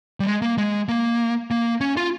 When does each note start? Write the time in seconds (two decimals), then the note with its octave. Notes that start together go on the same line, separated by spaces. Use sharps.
0.20 G3
0.26 G#3
0.42 A#3
0.58 G#3
0.89 A#3
1.51 A#3
1.81 C#4
1.97 F4